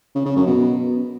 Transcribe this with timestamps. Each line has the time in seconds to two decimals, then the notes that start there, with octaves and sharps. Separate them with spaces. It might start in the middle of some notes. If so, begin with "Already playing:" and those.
0.15 C#3
0.26 C#3
0.36 F#2
0.47 B2